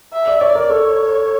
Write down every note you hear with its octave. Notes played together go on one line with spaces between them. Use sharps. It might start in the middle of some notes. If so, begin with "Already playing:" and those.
E5
D5
C#5 D5
A#4
A4 C#5